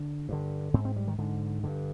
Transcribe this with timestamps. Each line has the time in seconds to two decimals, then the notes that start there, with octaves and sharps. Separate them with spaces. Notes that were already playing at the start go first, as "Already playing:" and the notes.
Already playing: D3
0.29 G2 D3
0.74 G#2 C4
0.85 C4
0.96 G3
1.08 D#3
1.18 G#2 D3
1.64 G2 D3